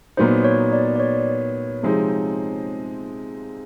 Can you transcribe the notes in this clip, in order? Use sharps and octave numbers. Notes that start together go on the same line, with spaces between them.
A#2 F#3 B3 D#4 C5
C#5
D5
D5
C#5
C3 F3 G#3 C4 D#4